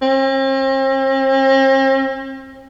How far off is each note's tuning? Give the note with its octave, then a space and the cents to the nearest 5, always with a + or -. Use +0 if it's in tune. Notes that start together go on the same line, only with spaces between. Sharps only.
C4 +45